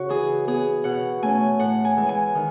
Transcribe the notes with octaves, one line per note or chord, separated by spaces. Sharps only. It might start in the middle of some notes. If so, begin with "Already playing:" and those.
Already playing: C#3 F#4
E3 G#4
B3 G#4
B2 F#5
A3 C#4 G#5
A2 F#5
G#5
E3 G#3
G#5
D#3